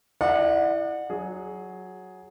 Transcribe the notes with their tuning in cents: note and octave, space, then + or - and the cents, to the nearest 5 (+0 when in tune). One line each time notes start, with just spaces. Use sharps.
E4 +0 D5 +35 F#5 -20
F#3 +0 G#4 +5